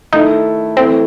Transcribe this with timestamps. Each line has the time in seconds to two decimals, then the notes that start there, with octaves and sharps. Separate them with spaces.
0.13 D#3 A3 D#4 E4 A4
0.76 E3 A3 C4 E4 A4